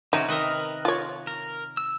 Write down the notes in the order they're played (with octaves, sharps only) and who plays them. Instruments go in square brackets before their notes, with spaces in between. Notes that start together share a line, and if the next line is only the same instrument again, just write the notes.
[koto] C3 [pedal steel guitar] D#3 C#4 F#4 [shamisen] D#4
[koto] D#3 D#5 E5 [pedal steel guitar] A#4 B4
[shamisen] F4 C#5
[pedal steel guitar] A#4
E6